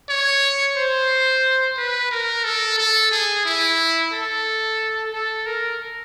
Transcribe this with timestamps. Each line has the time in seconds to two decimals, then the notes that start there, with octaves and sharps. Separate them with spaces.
0.09 C#5
0.77 C5
1.77 B4
2.11 A#4
2.44 A4
2.78 A4
3.11 G#4
3.45 E4
4.13 A4
5.13 A4
5.46 A#4